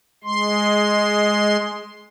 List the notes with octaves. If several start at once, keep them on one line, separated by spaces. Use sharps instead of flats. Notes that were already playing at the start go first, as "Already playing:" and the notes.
G#3 C6